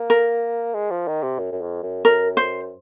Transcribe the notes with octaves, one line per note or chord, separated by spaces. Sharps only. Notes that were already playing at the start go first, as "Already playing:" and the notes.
Already playing: A#3
A#4
G#3
F3
D#3
C3
F#2
F#2
F2
F#2
F#2 A#4
C5